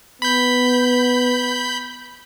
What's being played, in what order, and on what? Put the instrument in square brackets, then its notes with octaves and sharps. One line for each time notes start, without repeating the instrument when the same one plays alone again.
[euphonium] B3 [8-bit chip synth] B5 G6